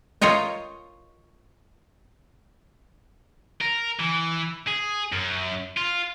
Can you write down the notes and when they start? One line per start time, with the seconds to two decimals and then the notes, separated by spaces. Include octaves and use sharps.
0.22 F4 A#4 C#5 D#5 G5
3.61 A#4
4.00 E3
4.67 G#4
5.12 F#2
5.77 F4